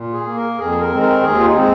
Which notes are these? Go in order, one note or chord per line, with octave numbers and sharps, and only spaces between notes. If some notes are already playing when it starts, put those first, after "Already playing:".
Already playing: A#2
G#4
A#3
A#4
F2 G#4
A#4
D#3 G#3 C4
A#4
D#2 G#4
F4
D#4
G#3 C4